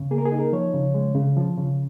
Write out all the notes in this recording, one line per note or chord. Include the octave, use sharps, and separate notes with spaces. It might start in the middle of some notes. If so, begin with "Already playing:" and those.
Already playing: C#3
A#3 G#4
A#4
G#4
D#4
A#4
F3 C#5
C#3
G#3
C#3
F3
C#3